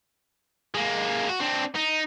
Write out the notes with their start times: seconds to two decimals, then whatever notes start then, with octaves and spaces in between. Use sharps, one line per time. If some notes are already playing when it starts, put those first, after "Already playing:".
0.74 G#3 A#3
1.29 F#4
1.41 C4 D4
1.75 D#4